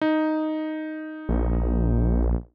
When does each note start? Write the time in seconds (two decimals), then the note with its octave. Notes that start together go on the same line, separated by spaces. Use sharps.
0.01 D#4
1.29 A#1